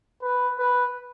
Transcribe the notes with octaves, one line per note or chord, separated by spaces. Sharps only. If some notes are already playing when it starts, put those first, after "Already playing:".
B4
B4